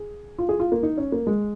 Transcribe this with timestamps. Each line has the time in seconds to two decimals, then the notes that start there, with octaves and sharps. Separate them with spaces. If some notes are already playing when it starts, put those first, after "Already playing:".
Already playing: G#4
0.39 F4
0.49 G#4
0.60 F4
0.72 A#3
0.83 D#4
0.98 C#4
1.12 A#3
1.27 G#3